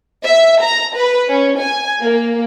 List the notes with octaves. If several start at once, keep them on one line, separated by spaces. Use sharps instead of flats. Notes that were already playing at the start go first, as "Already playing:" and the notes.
E5
A#5
B4
C#4
G#5
A#3